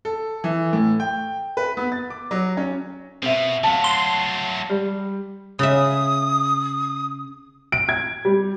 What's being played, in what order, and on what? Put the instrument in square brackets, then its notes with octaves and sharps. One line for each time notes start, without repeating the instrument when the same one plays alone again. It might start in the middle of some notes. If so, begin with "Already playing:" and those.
[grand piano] A4
E3
A2
G5
B4
B3
A6
D6
F#3
C#4
[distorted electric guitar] B2 [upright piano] C4 E5
[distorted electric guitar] F#3 A3 [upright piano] F5 A5
[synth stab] C6
[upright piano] G3
[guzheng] C#3 E5 [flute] D#6
[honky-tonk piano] D7
G#6
G3